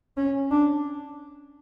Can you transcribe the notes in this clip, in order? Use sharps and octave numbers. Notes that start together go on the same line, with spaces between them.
C#4
D4